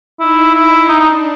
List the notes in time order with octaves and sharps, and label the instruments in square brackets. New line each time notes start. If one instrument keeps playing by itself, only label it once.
[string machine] D#4 [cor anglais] E4
[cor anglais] E4
[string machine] D4 [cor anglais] D#4
[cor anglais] D#4